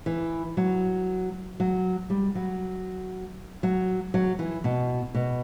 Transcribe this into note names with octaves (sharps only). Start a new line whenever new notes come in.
E3
F#3
F#3
G3
F#3
F#3
F#3
E3
B2
B2